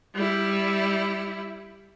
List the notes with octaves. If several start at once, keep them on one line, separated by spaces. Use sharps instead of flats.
G3 E4